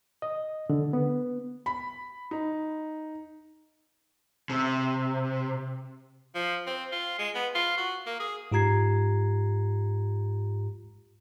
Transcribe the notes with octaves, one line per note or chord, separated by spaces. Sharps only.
D#5
D3
B3
B5
D#4
C3
F3
C4
F4
G#3
B3
F4
F#4
A#3
G#4
G#2 F4 G4 A#5 G#6 C7